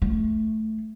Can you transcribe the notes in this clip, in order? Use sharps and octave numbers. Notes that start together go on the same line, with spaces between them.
A3